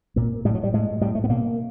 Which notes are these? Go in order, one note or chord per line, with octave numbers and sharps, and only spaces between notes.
A#2 A#3
A2 G3
F#3
G3
A2 G#3
A2 G3
A3
B3
B2 A#3